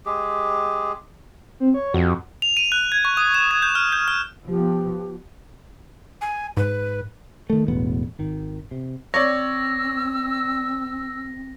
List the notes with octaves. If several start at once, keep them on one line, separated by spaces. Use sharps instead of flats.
G#3 G4 G#4
C4
C#5
F2 F#4
F7
D#7
F#6
G#6
C#6
D#6
E7
G#6
G6
F6
G6
F6
F3 B3 G4
G#5
G#2 B4
D#3 A3
E1 A1 B3
G#1 D#3
C3
C4 C#5 D5 E6 A#6